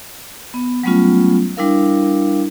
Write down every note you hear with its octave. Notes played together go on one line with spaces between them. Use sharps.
B3
F#3 G3 A3 B3 C#4 F4
G3 D4 E4 A#4 F5